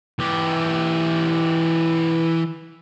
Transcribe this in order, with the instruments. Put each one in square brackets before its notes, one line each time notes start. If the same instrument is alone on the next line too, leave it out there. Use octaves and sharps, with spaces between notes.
[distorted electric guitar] E3 G4